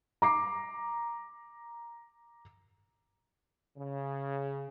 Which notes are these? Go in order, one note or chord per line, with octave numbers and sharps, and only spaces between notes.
A#5 D6 C7
C#3